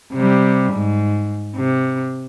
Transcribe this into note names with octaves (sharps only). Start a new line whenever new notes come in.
C3 G3
G#2
C3